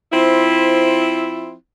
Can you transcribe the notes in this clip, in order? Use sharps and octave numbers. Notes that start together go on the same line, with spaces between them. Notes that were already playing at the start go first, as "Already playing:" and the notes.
F3 C4 E4